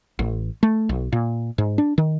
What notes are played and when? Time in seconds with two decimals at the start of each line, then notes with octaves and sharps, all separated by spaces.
0.19 A1
0.63 A3
0.89 B1
1.12 A#2
1.58 G#2
1.78 D4
1.98 D#3